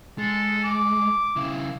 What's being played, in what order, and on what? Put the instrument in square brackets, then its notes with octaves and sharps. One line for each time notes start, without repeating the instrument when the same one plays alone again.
[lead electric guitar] G#3 [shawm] A4
[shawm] D6
[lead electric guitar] C#3 E4